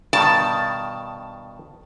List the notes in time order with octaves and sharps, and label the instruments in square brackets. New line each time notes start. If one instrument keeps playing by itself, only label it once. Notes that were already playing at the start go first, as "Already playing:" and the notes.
[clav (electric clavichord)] G2 B2 D#3 [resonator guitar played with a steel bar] A5